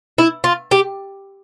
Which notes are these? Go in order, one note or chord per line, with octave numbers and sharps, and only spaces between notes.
E4
F4
G4